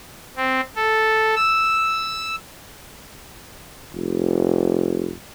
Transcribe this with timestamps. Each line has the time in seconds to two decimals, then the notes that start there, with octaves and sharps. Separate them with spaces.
0.37 C4
0.76 A4
1.36 E6
3.95 F1